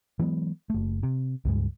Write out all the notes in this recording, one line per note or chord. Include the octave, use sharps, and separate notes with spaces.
E3 F#3 G#3 B3
F#1 A3
C3
C#2 G2 G#3